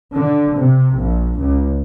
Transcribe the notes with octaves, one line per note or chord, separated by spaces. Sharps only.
D3
C3
A#1
C#2